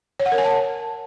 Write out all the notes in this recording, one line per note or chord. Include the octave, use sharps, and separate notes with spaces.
C#5
F#5
A#4
G#5
A5